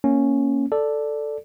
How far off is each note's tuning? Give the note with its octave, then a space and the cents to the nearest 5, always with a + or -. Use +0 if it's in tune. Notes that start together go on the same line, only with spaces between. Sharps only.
A#3 +0 C#4 +0
A4 +0 D5 +0